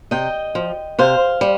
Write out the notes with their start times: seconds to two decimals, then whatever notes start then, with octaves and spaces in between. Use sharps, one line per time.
0.11 C3 D#5 G5
0.55 F3
0.99 C3 C5 F5
1.41 G3